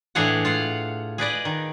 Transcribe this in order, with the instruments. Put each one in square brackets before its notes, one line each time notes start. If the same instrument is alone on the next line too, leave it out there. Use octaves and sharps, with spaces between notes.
[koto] A2 E3 D4 G#4 F5 F#5
F4 F5 F#5
G#4 B4 D5 D#5
D#3